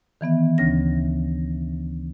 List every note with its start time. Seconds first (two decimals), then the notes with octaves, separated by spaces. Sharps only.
0.21 D#3 E3 B3 E5
0.58 D2 C#3 C#4 A#6